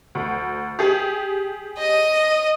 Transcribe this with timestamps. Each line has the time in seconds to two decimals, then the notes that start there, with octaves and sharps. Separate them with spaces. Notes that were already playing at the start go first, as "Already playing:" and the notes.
0.15 D2
0.79 G4 G#4
1.78 D#5 D#7